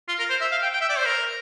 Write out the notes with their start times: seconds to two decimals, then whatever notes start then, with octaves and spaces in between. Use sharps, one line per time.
0.08 F4
0.19 A#4
0.30 C5
0.41 E5
0.51 F5
0.62 G5
0.73 G5
0.81 E5
0.89 D5
0.98 C5
1.06 A#4